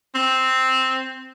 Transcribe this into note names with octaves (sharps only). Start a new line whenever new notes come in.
C4